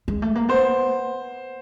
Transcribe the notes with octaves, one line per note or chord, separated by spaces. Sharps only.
G#3
A3
A#3
B3 C5